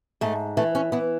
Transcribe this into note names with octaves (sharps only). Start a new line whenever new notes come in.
G#2 A3
E3 A3
C#4
E3 B3